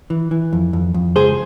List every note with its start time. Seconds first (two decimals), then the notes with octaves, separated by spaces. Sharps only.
0.10 E3
0.31 E3
0.53 F2
0.73 F2
0.94 F2
1.16 C#2 G#4 C5